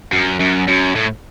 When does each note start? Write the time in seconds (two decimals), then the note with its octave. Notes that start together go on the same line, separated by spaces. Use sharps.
0.13 F#2
0.40 F#2
0.68 F#2
0.96 A2